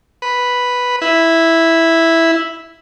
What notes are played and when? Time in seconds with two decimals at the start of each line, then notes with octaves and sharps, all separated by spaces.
0.22 B4
1.02 E4